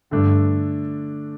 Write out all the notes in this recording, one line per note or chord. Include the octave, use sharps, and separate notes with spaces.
G2 D3 A3 D4